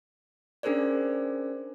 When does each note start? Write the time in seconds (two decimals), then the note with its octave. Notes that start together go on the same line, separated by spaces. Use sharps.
0.63 C#4 D4 G#4 A#4 C5 D5